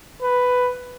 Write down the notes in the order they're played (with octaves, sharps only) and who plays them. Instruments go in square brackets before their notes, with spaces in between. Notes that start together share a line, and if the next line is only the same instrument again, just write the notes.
[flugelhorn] B4